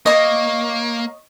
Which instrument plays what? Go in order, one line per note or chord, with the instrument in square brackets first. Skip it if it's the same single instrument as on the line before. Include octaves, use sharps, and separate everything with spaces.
[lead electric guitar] A#3 [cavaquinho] C#5 D#5